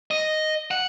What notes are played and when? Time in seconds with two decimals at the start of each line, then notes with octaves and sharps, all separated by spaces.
0.11 D#5
0.71 F#5